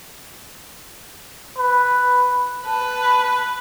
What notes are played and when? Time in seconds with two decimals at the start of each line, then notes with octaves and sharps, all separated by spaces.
1.57 B4
2.66 B4 A5